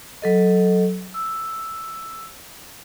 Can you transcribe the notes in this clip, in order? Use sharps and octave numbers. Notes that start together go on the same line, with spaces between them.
F#3 A4 D#5
E6